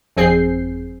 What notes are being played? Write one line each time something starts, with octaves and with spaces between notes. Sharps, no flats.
G1 F2 C4 G#4 G6 C7